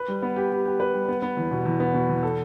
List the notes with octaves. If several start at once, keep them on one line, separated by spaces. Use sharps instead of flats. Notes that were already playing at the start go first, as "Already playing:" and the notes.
Already playing: B4
G3
B3
G4
G4
G4
B4
G3
B3
B3
E2
B2
E2
B3
B2
E2
A4